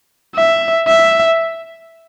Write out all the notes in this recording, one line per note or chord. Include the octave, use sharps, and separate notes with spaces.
E5
E5